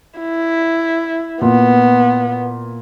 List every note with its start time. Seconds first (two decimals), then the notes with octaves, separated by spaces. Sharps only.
0.19 E4
1.41 A#2 B3